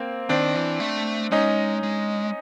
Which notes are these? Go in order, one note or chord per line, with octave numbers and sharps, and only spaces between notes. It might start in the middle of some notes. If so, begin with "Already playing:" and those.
Already playing: A#3 C4
D#3 C4 D4
E3
A3
G#3 C#4 D#4
G#3